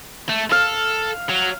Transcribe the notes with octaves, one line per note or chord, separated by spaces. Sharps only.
A3
A4 F5
F#3